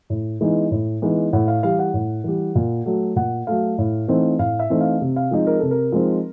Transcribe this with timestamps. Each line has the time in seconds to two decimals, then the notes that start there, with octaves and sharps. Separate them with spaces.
0.10 A2
0.41 E3 G#3 B3 D#4
0.71 A2
1.02 E3 G#3 B3 D#4
1.33 A2 F#5
1.48 F5
1.63 E3 G3 F5
1.79 F#5
1.94 A2
2.24 E3 G3
2.55 A#2
2.86 F#3 A3
3.16 A#2 F#5
3.47 F#3 A3 F5
3.78 A2
4.08 E3 A3 C4 D#4
4.39 A2 F5
4.59 E5
4.70 E3 A3 C4 D#4
4.81 F5
5.01 C3
5.16 F5
5.31 F3 G#3 C4 D#4
5.47 A#4
5.59 C3 A4
5.71 A#4
5.92 F3 G#3 C4 D#4